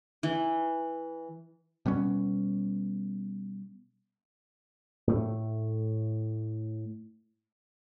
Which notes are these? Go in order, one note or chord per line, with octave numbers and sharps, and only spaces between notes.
E3
B2 G3 B3 C#4
A2 A3